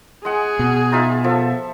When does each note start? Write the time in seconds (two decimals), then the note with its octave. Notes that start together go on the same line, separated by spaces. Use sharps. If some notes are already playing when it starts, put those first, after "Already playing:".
0.25 G#3 G#4 F#5
0.59 B2
0.92 D#4 F4 E5
1.24 F3 A4 E5